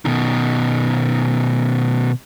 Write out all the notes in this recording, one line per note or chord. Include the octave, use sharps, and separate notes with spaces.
B2 D#3